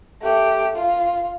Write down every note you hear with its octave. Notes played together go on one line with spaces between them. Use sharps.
A3 G4
F4